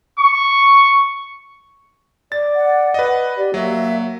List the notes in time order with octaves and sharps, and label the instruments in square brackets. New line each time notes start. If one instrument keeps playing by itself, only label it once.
[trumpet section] C#6
[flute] D5 [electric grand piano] A6
[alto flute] F#5
[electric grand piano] B4 D#5
[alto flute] G4 [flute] D5
[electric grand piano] F#3 [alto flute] A#3 [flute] E5